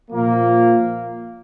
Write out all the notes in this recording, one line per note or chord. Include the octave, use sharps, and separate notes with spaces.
A#2 F3 A#3